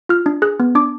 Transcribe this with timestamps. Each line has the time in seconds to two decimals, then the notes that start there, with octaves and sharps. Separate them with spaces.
0.09 F4 F6
0.26 D4
0.42 G#4 F#6
0.60 B3
0.75 D4 D6